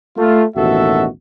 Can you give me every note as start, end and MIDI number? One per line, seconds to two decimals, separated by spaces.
0.18 0.44 57
0.18 0.44 65
0.56 1.06 33
0.56 1.06 39
0.56 1.06 47
0.56 1.06 66
0.56 1.06 69
0.56 1.06 76